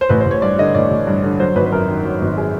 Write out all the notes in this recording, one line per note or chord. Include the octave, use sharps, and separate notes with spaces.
C5
A1 B4
C5
A1
C#5
G2 D5
D3 D#5
A1 D5
A1
G2
D3
F#3 C5
G#1 B4
B4
F#2 A#4
D#3
F#3
G#1
G#4